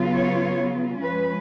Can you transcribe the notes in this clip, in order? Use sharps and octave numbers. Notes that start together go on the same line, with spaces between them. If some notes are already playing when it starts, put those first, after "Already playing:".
Already playing: C#3 F#3 B3 F4
C#5
F3 G#3 C#4 B4